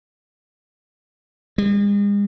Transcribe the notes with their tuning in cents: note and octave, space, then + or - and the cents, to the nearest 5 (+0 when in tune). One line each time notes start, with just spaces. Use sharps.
G#3 -40